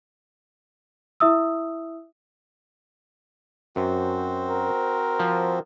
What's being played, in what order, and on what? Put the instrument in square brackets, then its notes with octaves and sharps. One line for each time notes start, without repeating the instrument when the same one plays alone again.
[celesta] E4 E5 D#6 E6
[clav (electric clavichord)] F#2 [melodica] C4 F#4 C5
[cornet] A#4
[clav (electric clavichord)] F3